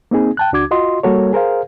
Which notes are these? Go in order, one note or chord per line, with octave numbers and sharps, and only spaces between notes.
A#3 C4 D#4 G#4
G5 A5 F#6
C#2 D4 F#4 D6 G#6
F4 F#4 D#5 C6
G3 A#3 F#4 A4 A#4 C#5
G#4 A#4 C5 F5